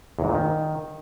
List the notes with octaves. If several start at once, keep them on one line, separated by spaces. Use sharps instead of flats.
E2
G#2
A#2
D#3